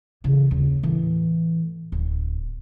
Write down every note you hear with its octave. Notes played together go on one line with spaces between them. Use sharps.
C#3 E3
D#2 C#3
A2 E3
D1